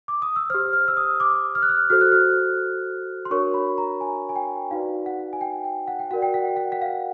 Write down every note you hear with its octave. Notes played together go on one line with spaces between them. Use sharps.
D6
D#6
E6
G4 C5 F6
F6
E6
D#6
D6
F6
F#6
F6
F#4 A4 C5 F6
F#6
F6
C6
D4 F#4 A#4 C#5 C#6
B5
A#5
G#5
G#5
G5
D#4 F#4 B4 D5 F5
F#5
G#5
G5
G5
F#5
G5
F#4 A#4 D5 F#5
G5
F#5
G5
F#5
F#5
F5